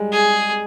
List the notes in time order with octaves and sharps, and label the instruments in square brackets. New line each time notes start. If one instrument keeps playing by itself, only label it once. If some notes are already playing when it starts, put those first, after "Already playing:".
Already playing: [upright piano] G3 G#3
[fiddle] G#4